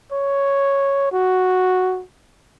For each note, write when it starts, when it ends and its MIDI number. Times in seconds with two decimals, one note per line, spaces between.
0.12 1.09 73
1.12 2.03 66